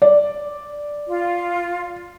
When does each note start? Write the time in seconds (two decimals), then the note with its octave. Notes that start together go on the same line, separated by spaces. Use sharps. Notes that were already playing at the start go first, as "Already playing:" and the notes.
0.02 D5
1.08 F4